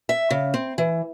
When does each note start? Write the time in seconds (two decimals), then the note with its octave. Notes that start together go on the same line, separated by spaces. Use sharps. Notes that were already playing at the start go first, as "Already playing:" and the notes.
0.09 E5
0.31 C#3
0.54 C4
0.78 E3